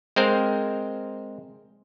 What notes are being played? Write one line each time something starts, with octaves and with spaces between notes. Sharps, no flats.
G#3 C4 A#4 C5 F5